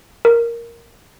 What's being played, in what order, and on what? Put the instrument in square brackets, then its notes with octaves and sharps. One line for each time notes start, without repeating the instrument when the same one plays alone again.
[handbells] A#4